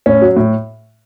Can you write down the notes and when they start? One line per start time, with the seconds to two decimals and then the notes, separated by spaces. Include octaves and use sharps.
0.06 A2 C#4
0.22 F#3
0.37 A2